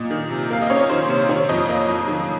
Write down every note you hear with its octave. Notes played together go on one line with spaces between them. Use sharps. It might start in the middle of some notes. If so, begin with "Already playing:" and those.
Already playing: A#2 D#5
D#3
C3
A#3 F5
D#5
C#4 C#5
D#3 C5
C3 C5
D#3 C#5
F2 D#5
A#3 D#5
F2
D#3